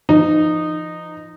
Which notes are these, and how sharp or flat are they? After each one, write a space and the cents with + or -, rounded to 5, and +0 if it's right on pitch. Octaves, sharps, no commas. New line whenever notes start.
F3 -35 D#4 -15